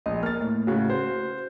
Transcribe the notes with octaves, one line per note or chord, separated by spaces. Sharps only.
A#1 D#5
A#3 F6 A6
A2
A2 C#3 F#4
C5